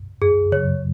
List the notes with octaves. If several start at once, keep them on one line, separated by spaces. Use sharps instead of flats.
F#2 G#4
C#3 F#3 C#5